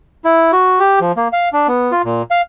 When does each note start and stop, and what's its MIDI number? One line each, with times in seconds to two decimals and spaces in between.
0.25 0.51 64
0.52 0.79 66
0.80 0.99 67
1.01 1.12 53
1.17 1.28 58
1.33 1.49 77
1.53 1.67 62
1.68 1.92 59
1.92 2.02 65
2.04 2.22 46
2.31 2.41 77